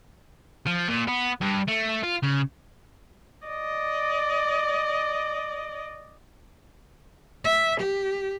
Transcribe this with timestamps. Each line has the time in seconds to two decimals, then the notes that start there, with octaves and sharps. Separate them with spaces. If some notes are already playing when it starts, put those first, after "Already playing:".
0.67 F3
0.88 A#2
1.08 B3
1.42 G2
1.68 A3
2.04 F4
2.23 C#3
3.47 D5 D#5
7.45 E5
7.81 G4